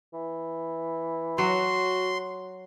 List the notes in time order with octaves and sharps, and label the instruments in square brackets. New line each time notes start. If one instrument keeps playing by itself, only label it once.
[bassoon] E3
[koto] F#3 [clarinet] F#4 [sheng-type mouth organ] C6